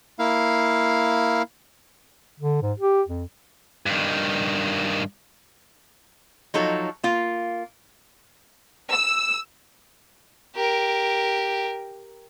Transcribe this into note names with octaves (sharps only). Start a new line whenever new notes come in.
A#3 E4 F5
D3
G#2
G4
F2
G2 D#3
F3 F#3 D#4 A4 C#5
A#3 F4
E6
G4 A#4